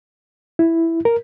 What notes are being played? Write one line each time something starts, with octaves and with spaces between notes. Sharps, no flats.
E4
A#4